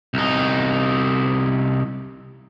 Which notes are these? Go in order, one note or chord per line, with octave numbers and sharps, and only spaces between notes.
C2 D#4